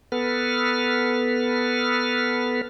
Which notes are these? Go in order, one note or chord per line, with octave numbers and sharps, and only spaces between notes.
B3 A4 B4 F6